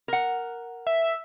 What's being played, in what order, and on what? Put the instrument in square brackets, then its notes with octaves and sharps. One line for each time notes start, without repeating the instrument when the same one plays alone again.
[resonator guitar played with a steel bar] A#4 F#5
[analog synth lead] E5